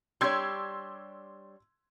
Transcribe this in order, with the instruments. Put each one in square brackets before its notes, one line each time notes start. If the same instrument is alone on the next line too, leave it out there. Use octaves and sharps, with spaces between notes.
[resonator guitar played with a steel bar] G3 D4 C#5 [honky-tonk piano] C6 E6 G#6